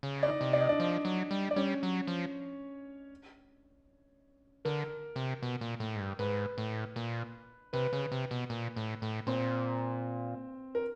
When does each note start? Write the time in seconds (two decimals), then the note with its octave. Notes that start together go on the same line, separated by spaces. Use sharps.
0.03 C#3
0.23 D5
0.28 D#4 D#5
0.41 C3
0.53 D5
0.61 D#5
0.69 D4 D5
0.80 F3
1.05 F#3
1.31 G3
1.51 D5
1.56 G3 C#4 C#5
1.83 F#3
2.07 F3
4.65 D3 A#4
5.16 C3
5.42 B2
5.61 A#2
5.80 A2
5.96 G#2
6.00 G2
6.19 G#2 B4
6.58 A2
6.96 A#2
7.73 C3 B4
7.93 C#3
8.12 C3
8.31 B2
8.50 A#2
8.76 A2
9.02 A2
9.27 A#2 C4 C5
10.75 A#4